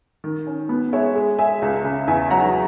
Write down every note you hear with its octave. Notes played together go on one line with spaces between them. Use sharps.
D#3
C#4
B3
G#3 C#5 E5
G#3
G#3 E5 G#5
C#2
C#3
E2 E5 G#5
F#3 F#5 A#5